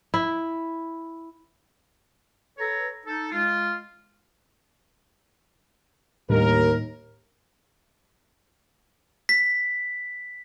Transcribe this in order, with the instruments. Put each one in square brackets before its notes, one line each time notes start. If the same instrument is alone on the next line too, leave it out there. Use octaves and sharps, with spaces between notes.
[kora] E4
[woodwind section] A4 B4 C#5 A#5
D#4 A4
G#3 F4
[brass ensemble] D#2 A#4 [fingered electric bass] A2 G3 D4
[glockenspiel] B6